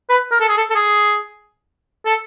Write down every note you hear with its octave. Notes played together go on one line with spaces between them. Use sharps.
B4
A#4
A4
G#4
A4
A4
G#4
A4